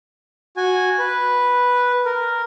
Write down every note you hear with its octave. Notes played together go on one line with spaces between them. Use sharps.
F#4 G#5
B4
A#4